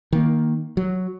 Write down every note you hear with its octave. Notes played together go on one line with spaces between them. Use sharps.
D#3 A#3
F#3